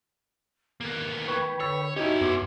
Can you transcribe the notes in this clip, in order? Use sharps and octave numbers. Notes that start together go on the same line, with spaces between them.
D#3 A#3 B3
B4 G5 B5 C#6 G#6
D3 C#5 C#6 E6 A6
C#4 D#4 E4 F#4 G4 D#5 G#6
F#2 B3 C6 D6 G#6